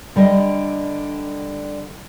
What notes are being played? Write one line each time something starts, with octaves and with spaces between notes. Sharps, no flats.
D3 G3 D4 D#5